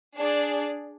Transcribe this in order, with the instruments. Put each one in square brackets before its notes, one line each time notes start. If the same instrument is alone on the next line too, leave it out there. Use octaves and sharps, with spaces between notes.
[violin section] D4 G#4 D5